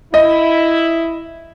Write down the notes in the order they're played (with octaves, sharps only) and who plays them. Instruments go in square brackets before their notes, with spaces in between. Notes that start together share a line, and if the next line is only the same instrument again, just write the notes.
[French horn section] E4 [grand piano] D#5